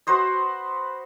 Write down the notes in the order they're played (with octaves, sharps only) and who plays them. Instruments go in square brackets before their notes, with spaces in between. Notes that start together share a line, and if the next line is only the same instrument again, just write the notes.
[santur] F#4 B4 C5 D#5